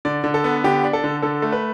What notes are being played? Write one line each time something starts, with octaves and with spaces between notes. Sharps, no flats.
D3 D5
D3
A4
B3
D3 G4
D4
A4
D3
D3 A4
A3
B4